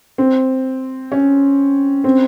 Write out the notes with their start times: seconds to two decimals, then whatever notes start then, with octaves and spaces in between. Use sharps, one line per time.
0.18 C4
1.12 C#4
2.04 C4